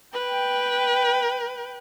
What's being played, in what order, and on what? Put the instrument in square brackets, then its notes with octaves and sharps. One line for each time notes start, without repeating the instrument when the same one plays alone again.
[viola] B4 [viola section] G5